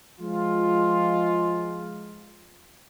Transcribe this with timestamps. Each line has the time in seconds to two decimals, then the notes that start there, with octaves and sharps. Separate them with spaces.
0.20 F3 G#3 F4